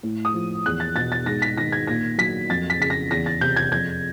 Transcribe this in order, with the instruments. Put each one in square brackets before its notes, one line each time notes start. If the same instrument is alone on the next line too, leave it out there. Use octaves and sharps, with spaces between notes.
[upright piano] A2
D#6
F3
E2 F#6
A6
B2 A6
A6
G#2 A#6
B6
D#3 A#6
G#6
A#2 A#6
F#3 B6
F2 A6
B6
C#3 B6
A#6
E2 A#6
A6
C3 G6
G#6
F2 G#6